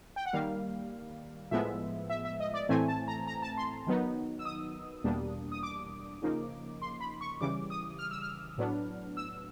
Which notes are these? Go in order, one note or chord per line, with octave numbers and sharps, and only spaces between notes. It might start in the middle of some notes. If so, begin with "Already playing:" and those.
G5
F#5
D#3 G3 A#3 F5
A2 F3 G#3 B3 E5
E5
E5
D#5
D5
A2 E3 A3 C4 G#5
A5
A#5
A#5
A5
C6
D#3 F#3 B3 D#4
E6
D#6
E2 B2 G3 A#3 D4
D#6
D6
C#3 F3 A#3 D#4
C6
B5
C#6
C#3 E3 G3 D6
D#6
F6
E6
F6
A2 F#3 B3 D4
E6